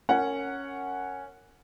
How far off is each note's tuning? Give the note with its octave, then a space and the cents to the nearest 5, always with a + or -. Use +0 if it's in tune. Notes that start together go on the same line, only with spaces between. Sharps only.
C#4 +0 A#4 -20 F#5 +0